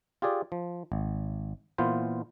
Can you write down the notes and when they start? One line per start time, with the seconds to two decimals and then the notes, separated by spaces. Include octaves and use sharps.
0.22 F4 G4 G#4 D5
0.52 F3
0.92 G#1
1.78 A#2 E3 B3 F4 C5